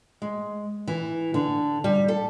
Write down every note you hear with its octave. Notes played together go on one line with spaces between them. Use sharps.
G#3
E3
D3
G3
A4